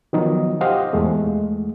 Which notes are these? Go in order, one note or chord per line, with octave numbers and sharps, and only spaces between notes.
D#3 F3 F#3 B3 D#4
G4 C5 D#5 F5 F#5
E2 G#3 A3